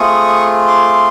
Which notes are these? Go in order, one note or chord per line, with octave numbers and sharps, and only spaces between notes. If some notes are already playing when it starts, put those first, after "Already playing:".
Already playing: A3 C4 F4 G#4 C#6 D#6
C6 D6